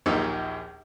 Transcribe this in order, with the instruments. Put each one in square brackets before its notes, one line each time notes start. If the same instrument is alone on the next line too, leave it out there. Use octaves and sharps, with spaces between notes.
[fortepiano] A#1 D#2 A#2 A#3 D#4 E6